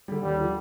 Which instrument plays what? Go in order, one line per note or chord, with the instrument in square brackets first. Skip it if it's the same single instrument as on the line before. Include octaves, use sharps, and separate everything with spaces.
[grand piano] D3 G3
[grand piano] D#2 [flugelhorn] G3
[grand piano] D3 F3